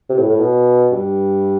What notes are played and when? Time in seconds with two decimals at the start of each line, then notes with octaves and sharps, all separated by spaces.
0.10 C3
0.19 A2
0.30 A2
0.40 B2
0.92 G2